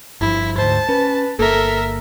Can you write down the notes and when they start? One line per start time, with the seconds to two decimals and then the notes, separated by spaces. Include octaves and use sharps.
0.21 G1 G2 F3 E4
0.58 D2 G#2 C5 A5
0.89 C#4 B4
1.39 G1 A#3 A4 A#4 E5